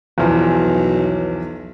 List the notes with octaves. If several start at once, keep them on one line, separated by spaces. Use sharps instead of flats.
B1 E2 E3 F3